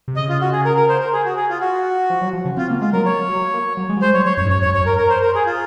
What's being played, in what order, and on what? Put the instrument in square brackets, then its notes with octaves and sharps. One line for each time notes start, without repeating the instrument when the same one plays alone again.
[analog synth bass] C3
[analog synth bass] C#3 [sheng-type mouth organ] D#5
[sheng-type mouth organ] F4
F#4
G#4
A#4
A#4
C5
A#4
G#4
F#4
G#4
F4
F#4
[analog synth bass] F3
F#3
F3
C#3
[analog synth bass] C4 [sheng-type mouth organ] F4
[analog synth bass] A#3
[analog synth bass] G#3 [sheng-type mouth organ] F4
[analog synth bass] F#3 [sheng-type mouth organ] A#4
[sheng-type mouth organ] C#5
[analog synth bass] F#3
A#3
F#3
G#3
F#3
[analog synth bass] G#3 [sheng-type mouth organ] C5
[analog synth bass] F#3 [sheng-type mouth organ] C#5
[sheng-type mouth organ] C#5
[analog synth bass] F#2 [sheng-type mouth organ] C#5
[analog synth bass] G#2
[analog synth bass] F#2 [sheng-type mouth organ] C#5
[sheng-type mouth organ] C#5
[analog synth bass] F#2
[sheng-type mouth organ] C#5
[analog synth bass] F#2
[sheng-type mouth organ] A#4
A#4
C5
A#4
G#4
F4